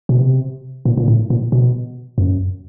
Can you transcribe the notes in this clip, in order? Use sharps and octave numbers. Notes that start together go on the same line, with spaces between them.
B2
C3
A#2
A#2
A2
A#2
B2
F#2